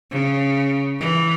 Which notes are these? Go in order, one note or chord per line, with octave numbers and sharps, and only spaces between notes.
C#3
E3